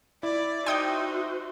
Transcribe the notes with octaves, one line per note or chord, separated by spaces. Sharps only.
E4 D5
D#4 F#4 C5 E5 G5 C6 D#6 G6